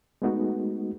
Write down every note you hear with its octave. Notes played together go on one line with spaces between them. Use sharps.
G#3 A3 B3 D#4 F#4